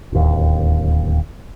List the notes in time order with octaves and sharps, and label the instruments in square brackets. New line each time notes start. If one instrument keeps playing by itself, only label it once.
[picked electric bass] D1 D#2